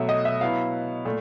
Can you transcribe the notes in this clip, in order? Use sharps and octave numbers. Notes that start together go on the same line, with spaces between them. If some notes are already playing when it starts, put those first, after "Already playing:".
Already playing: B2 F#3 A3 E5
D#5
E5
F#3 B3 E4 F5
A#2 A3